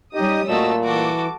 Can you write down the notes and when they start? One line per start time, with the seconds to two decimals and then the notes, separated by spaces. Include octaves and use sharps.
0.14 G3 C#4 D#4 G4 D#5 D#6
0.49 A#2 A3 F#4 D#5 E6
0.84 E3 F#4 A4 D6